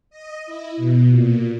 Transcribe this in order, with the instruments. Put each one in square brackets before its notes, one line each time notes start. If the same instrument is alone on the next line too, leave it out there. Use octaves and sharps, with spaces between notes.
[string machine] D#5
E4
B2
A#2